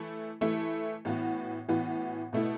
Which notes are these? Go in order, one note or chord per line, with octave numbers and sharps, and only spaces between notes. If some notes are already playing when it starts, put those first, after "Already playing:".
Already playing: E3 A3 E4
E3 A3 E4
A2 E3 B3 F#4
A2 E3 B3 F#4
B2 A3 E4